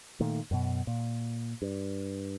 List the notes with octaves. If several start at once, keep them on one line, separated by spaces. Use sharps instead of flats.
A#2 D#3 A3
F#2 B2
A#2
G2